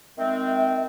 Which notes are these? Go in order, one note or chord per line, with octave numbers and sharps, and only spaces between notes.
D#3 G#3 C4 E5